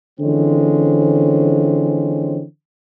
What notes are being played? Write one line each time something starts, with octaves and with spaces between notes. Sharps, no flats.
D3 E3 F3 G#3 C4 C#4